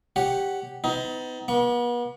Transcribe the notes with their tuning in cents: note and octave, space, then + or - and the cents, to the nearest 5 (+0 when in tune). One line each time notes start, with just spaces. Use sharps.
G4 +0 C#5 +0 F#5 +10
B3 +40 D#4 +25
B3 -40 C#6 +25